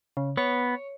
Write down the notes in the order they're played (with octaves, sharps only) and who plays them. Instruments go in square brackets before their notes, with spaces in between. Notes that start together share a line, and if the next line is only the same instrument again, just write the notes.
[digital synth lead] C#3
[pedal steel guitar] B3 [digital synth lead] C#5